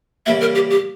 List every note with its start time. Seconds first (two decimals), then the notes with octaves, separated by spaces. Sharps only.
0.26 C#3 E3 G3 A#3 E5
0.41 A#4
0.55 G4
0.70 G4